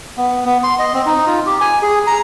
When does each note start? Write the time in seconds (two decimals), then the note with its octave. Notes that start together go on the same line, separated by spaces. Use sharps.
0.17 B3
0.45 B3
0.64 C6
0.79 D#5
0.94 C4
1.06 D#4
1.27 F4
1.46 G4
1.61 G#5
1.82 G#4
2.07 A#5